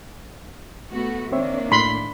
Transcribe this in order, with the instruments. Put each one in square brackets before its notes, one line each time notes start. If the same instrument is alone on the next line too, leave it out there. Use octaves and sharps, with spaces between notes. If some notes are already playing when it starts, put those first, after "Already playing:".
[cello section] A3 B3 F#4
[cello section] D#3 A#3 D4 [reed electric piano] C4 C#5 E5
[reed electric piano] A2 [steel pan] B5 C6